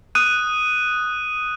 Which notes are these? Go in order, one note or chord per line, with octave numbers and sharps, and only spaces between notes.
D#6 F#6 D#7